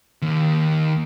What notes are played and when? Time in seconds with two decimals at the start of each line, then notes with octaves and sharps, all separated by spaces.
0.22 D#2